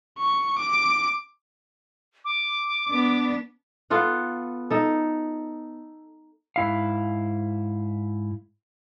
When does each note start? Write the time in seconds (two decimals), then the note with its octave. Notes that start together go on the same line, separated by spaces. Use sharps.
0.19 C#6
0.59 D6
2.25 D6
2.89 B3 D4
3.90 B3 F4 A4 F#5
4.70 D#4 A4
6.56 G#2 E4 F5